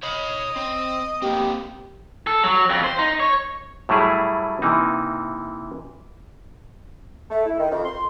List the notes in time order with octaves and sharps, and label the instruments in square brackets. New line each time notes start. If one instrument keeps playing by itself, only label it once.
[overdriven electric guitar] C#5 B5 [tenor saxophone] D#5
[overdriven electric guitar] C4
[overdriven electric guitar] A#3 C4 [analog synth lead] G4
[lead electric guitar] A4
F#3
F2
C5
D#4
C#5
[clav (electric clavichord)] A2 F#3 G3 A3 E4 G#4
C3 E3 A#3 D#4
[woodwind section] A3
E4
D#3
F2
C6